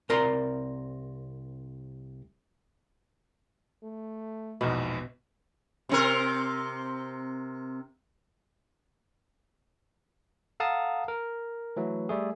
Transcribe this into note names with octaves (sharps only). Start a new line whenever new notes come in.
C2 C4 A#4 D5 A#5 C6
A3
A#1 E2 G#2 B2
C3 C4 A#4
A4 F5 F#5 A5 A#5 D#6
A#4
E3 F#3 A3
G3 A3 G#4